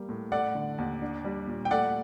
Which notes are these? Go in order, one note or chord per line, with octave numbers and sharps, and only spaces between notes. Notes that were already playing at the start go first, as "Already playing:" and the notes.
Already playing: G3 A#3
A2
A3 D5 F#5
D3
D#2
D4
G3
A#2
G5
A3 D5 F#5